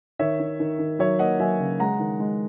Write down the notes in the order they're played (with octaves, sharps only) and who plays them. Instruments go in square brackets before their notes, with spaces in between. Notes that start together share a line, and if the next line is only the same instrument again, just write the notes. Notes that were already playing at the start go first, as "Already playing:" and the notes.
[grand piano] D#3 C#5 E5
D#3
D#3
D#3
F#3 C#5 E5
A#3 D#5 F#5
F#3 E5 G#5
C#3
G#3 F#5 A#5
D#3
G#3